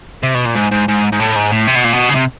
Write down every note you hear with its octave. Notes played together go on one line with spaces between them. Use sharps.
C3
B2
A#2
G#2
G#2
G#2
G#2
A2
G#2
A2
C3
B2
A#2
B2
C#3
C3